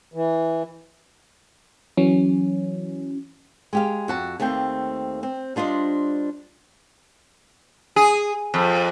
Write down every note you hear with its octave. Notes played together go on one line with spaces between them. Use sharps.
E3
E3 F#3 C#4
G#3 G4 F5
F2 F#4 A5
D#2 A3 A#3 C4 G5
C4
G3 D4 F4 C5 D#5
G#4
F2